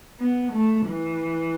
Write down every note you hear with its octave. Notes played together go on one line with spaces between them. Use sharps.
B3
A3
E3